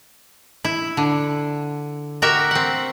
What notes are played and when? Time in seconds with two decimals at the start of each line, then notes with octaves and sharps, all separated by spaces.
0.65 E4
0.97 D3
2.22 F#4 G4 A#4 E5
2.51 C4 F#5